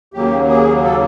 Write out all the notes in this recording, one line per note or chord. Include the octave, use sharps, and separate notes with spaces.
D#2 C#3 F#3 A#3 G4
G#4
A4